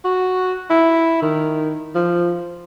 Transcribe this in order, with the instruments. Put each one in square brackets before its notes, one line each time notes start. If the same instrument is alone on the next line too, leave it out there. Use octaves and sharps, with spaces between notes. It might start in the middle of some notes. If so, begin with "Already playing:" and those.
[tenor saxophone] F#4
E4
D#3
F3